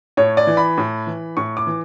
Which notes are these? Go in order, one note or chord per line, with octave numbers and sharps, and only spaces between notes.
A2 C#5
D5
E3
B5
A2
E3
A2 C#6
D6
E3